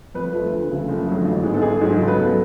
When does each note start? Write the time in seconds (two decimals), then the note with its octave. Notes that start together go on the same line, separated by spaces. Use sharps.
0.14 F2 B4
0.33 F3 A3
0.52 D2
0.69 C#3 F3 A3
0.88 F#1
1.07 F2 D3 F#3 A3
1.25 A1
1.43 G#2 G#3 B3
1.54 A4
1.62 A1 G#4
1.81 G#2 F#3
1.99 C#2 A4
2.08 B4
2.15 B2 F#3 A4